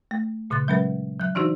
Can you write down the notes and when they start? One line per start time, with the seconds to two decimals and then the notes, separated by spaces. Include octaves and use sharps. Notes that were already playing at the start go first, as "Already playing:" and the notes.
0.11 A3
0.50 A#2 C#3 C6 F#6 A6
0.68 F#3 G#3 C#4 A#4 B4
1.20 F#3 F#6
1.35 E3 D4 D#4 F#4 C5